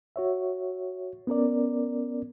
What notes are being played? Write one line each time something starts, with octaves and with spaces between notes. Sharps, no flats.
F#4 C#5 E5
B3 C#4 A#4 D5